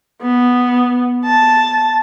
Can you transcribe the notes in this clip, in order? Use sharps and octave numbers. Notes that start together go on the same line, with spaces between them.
B3
A5